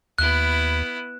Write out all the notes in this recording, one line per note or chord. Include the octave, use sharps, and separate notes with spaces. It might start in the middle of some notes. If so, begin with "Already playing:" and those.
D#2 B3 E4 F#6